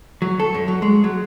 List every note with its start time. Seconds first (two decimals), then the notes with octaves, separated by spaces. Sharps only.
0.22 F#3
0.40 A4
0.54 F#2
0.68 F#3
0.82 G#3
1.04 F#3